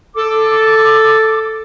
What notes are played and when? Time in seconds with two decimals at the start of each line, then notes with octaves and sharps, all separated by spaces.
0.15 A4 D6